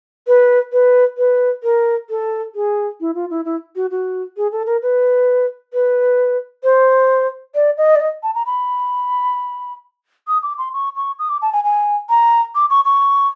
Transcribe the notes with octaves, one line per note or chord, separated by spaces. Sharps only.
B4
B4
B4
A#4
A4
G#4
E4
F4
E4
E4
F#4
F#4
G#4
A4
A#4
B4
B4
C5
D5
D#5
D5
D#5
A5
A#5
B5
D#6
D6
C6
C#6
C#6
D#6
D6
A5
G#5
G#5
A#5
D6
C#6
C#6